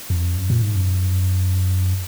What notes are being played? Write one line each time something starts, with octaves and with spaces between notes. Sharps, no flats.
F2
F#2
A#2
G#2
F#2